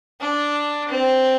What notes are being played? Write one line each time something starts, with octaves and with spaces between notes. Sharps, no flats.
D4
C4